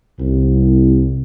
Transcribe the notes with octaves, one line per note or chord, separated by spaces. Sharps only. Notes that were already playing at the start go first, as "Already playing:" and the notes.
C2